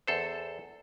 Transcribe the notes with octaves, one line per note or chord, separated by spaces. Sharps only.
E2 A4 C5